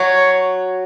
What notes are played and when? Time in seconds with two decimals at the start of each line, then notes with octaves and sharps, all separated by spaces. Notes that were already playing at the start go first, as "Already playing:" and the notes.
Already playing: F#3 C#5